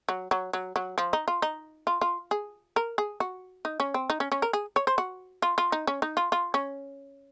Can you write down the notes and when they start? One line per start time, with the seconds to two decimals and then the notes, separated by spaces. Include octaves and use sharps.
0.09 F#3
0.31 F#3
0.53 F#3
0.76 F#3
0.98 F3
1.13 D#4
1.28 F4
1.42 D#4
1.87 F4
2.01 F4
2.31 G#4
2.76 A#4
2.98 G#4
3.20 F#4
3.65 D#4
3.80 C#4
3.94 C4
4.10 D#4
4.20 C#4
4.32 C#4
4.42 A#4
4.53 G#4
4.76 C#5
4.87 C5
4.98 F#4
5.42 F4
5.58 F4
5.72 D#4
5.87 C#4
6.02 D#4
6.17 F4
6.32 F4
6.54 C#4